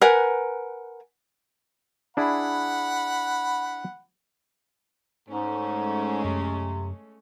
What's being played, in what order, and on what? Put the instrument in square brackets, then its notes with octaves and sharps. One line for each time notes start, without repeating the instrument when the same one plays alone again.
[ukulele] A#4 B4 F#5 G#5
[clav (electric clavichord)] D4 E4 G#4 [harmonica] F#5 B5
[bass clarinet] G#2 [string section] G#3 A3 C#4
[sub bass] F#2 [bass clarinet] C3